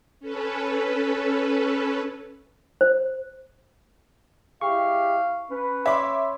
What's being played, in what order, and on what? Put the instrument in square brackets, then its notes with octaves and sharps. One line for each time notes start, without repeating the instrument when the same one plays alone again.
[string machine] C#4 A4 B4
[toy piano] C5
[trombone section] G#3 E4 G4 [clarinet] F5 [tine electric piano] C#6
[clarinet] C#4 [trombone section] B4
[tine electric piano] C#5 B5 C6 [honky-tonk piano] E5 D6